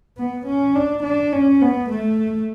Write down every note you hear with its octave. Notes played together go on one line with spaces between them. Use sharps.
B3
C#4
D4
D4
C#4
B3
A3